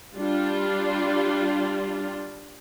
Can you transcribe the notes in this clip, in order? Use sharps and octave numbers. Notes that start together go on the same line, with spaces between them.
G3 D4 F4